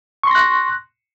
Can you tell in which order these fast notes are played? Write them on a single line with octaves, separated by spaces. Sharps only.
C#6 C6 A#6 F#6